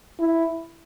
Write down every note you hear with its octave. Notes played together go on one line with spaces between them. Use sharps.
E4